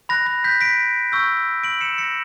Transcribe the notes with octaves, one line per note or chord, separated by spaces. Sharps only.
B5 F#6 A#6
A#6
G6 B6
B6 D7
C#6 E6 G6
D7 F#7
C#7 E7
A#6 C#7